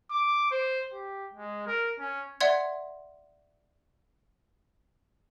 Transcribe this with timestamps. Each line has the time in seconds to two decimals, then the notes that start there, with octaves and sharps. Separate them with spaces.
0.11 D6
0.51 C5
0.92 G4
1.34 G#3
1.67 A#4
1.99 C#4
2.41 D5 E5 F#5 C6 G#6